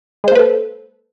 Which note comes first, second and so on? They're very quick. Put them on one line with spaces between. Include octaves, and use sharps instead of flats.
G#3 C5 A#3 B4 A4